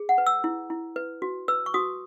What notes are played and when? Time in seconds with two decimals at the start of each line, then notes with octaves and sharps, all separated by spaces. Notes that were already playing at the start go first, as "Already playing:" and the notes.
Already playing: G#4
0.09 F#5
0.18 B4
0.27 E6
0.44 E4
0.70 E4
0.96 B4
1.22 F#4
1.48 B4 E6
1.66 C#6
1.74 F#4 D#6